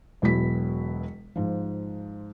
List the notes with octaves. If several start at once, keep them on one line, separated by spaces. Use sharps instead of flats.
E1 B2 F#3 E4 B6
G#2 F3